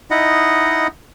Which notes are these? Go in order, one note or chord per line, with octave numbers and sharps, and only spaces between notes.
D#4 E4 D#5 F#5